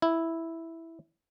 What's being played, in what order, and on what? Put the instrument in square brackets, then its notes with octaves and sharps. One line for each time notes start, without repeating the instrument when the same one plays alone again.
[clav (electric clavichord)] E4